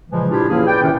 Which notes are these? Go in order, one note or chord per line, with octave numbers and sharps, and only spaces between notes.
A#2 C#3 E3 F3 G#3
A#2 D4 E4 F4 G4
A2 E3 A#3 C#4 G#4
B4 D5 G5
A2 C3 D#3 C#4